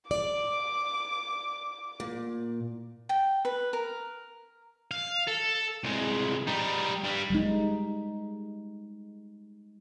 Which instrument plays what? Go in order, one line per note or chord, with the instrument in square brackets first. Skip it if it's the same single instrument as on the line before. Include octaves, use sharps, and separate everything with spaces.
[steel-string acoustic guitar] D5 [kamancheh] D6
[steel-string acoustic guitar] A#2
[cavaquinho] G5
B4
A#4
[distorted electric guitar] F5
A4
C2 G#3
G3 D#4
G2 G3
[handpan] G3 G#3 D#4